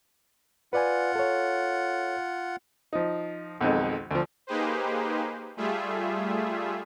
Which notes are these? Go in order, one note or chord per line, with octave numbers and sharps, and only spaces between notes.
F4 B4 D5 F#5 G#5
A4 C#5
F3 D#4
B1 F2 D#3 G#3
D2 F3
A#3 D#4 G4 G#4 B4 C5
G3 A3 F4 G#4 E5